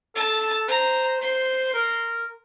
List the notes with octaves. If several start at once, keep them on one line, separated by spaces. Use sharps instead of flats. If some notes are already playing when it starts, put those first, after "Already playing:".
A4 A5
C5 A#5
C5 C6
A#4